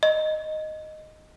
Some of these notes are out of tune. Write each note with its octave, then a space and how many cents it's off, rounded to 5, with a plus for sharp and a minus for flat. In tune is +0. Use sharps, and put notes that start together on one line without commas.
D#5 -5